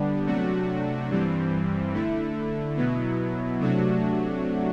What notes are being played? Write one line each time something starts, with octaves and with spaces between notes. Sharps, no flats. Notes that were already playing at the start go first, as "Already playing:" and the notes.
Already playing: D3 G3 B3 D4
C3 F#3 A3 D4 F#4
G2 E3 G3 C4
D3 A3 E4
B2 F#3 B3 E4
C3 F#3 A3 D4 F#4